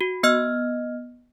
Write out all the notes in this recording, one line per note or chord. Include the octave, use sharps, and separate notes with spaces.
F#4
B3 D#5 F6